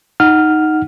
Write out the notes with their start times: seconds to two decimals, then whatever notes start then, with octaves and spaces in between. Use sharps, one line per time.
0.20 D#4 F#5 F6